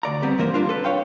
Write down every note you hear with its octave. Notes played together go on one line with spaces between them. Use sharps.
D2 D5 A#5
G3 B3 C4 G4
G2 E3 A#3 A#4 C5
G3 D4 F4
A4 B4
C#5 F5 G5 C6